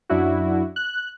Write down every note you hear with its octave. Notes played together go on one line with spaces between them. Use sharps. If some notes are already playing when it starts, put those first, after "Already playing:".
F#2 D4 E4 F#4
F#6